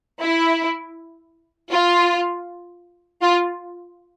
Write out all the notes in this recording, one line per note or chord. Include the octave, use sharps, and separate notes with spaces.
E4
F4
F4